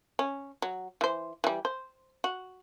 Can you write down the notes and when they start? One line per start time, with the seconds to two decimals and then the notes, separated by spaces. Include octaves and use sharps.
0.19 C#4
0.62 F#3
1.01 E3 C5
1.44 E3 G3
1.65 C5
2.24 F#4